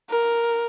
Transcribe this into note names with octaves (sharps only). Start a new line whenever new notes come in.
A#4